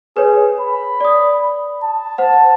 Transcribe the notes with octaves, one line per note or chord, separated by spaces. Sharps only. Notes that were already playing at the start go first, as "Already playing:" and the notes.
G#4 B4 C#5
B5
D5 D#6
A5
C5 F#5